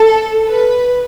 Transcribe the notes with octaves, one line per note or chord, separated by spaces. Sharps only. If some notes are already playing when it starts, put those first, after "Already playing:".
Already playing: A4
B4